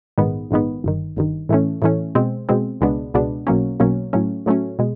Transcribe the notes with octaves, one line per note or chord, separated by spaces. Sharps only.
A#1 G#2 D#3 G#3 B3
A#1 G#2 D#3 G#3 B3
G1 G2 D#3
G1 G2 D#3
A2 E3 A3 C#4
A2 E3 A3 C#4
B2 G#3 C4
B2 G#3 C4
C#2 B2 G#3 B3 D4
C#2 B2 G#3 B3 D4
B1 B2 F#3 A#3 C#4
B1 B2 F#3 A#3 C#4
A2 F#3 A3 C#4
A2 F#3 A3 C#4
B2 G#3